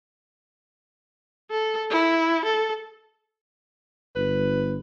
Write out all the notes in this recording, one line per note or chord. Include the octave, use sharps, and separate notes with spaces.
A4
E4
A4
G1 B4